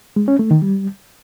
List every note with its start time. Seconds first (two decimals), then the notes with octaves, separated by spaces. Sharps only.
0.16 G#3
0.28 C#4
0.39 A3
0.51 D#3
0.62 G3